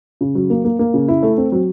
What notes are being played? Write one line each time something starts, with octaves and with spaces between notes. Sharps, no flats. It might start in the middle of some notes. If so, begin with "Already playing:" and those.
C#3
F#3
A#3
A#3
A#3
C#3
E4
A3
C4
F#3